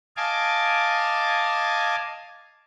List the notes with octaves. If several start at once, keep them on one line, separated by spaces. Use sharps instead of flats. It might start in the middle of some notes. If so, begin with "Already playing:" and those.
D#5 F5 G#5 A5 D6